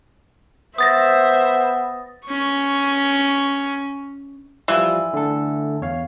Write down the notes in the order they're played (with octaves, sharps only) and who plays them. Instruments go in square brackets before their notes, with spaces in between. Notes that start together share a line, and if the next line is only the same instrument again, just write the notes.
[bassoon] B3 [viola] C5 E5 [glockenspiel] D#6 A6 A#6
[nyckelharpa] C#4 C#6
[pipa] E3 [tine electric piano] F3 G3 F4
[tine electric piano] D3 A3 A4
E2 C#5 F5